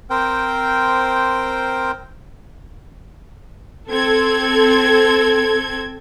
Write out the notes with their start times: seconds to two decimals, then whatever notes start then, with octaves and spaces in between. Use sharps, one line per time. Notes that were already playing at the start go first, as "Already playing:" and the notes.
0.10 C4 A#4 C5 G5
3.91 C4 A4 G#6